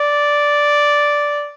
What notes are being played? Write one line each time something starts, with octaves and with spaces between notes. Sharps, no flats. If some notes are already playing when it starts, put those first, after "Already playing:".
Already playing: D5